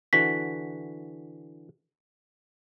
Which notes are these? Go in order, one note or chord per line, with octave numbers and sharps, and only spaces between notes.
D3 E3 F#4 B6